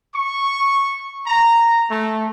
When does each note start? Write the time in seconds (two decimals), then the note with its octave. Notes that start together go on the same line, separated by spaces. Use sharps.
0.15 C#6
1.27 A#5
1.90 A3